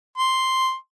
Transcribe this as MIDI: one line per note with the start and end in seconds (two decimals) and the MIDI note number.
0.18 0.74 84